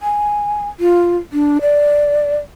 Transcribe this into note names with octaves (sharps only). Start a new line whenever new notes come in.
G#5
F4
D4
D5